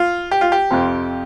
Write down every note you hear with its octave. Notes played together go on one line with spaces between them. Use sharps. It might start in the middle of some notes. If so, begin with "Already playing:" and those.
Already playing: F4
G4
F4
G4
F2 C3 F3